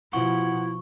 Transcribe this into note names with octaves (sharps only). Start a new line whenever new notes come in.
B2 F3 E4 F#5 C#6